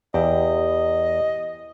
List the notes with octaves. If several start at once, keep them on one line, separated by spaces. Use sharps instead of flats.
E2 E4 G4 D#5